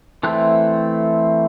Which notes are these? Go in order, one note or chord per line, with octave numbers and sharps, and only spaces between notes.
E3 A3 C4 F#6